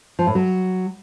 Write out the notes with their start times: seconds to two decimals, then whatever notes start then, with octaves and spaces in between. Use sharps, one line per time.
0.19 F3
0.27 A2
0.35 F#3